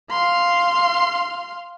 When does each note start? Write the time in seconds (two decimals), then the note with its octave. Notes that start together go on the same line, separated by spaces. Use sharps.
0.10 F5 C6